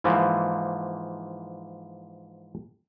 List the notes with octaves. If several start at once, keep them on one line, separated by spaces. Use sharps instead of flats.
G#2 E3 F3 A#3